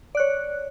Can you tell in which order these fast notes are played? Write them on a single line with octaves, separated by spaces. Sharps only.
D5 F#6 C#5